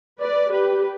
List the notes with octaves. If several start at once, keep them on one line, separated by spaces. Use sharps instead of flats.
B4 D5
G4 B4